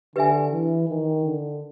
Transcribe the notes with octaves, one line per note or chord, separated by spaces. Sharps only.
D3 G4 B4 E5 G#5
E3
D#3
D3